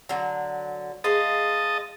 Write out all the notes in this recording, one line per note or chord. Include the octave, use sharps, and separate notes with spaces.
D3 F#3
G#3 D#5 F5 A5